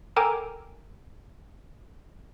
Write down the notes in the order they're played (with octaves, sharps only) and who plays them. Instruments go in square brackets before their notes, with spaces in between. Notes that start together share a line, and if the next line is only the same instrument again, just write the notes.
[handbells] A4 A#4 G5 G#5 A#5 D6